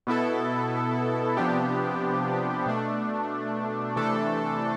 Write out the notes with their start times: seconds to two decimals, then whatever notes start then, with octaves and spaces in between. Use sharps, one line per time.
0.07 B2 B3 E4 A4
1.37 C3 F3 B3 D4 G4
2.66 B2 A3 D4
3.96 C3 E3 A3 D4 A4